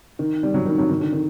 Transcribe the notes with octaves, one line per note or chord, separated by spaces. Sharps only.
D#3
G3
F#3
D#3
F#3
D#3
D3
D#3